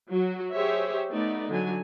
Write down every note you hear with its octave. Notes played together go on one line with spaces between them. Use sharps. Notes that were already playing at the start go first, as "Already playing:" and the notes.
F#3 F#4
G4 G#4 C5 C#5 E5
A3 B3 D#4 D5
D3 F#3 G#5